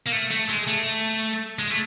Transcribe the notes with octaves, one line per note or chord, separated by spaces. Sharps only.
A#3
A3
A3
G#3
A3
G#3
A3